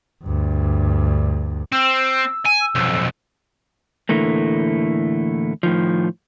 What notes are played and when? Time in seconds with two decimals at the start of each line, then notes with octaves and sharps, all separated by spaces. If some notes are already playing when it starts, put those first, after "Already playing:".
0.24 D2 G2
1.72 C4 E6
2.45 G#5
2.61 E6
2.75 B1 F2
4.09 A2 D3 E3 A3 A#3
5.63 A2 D#3 F3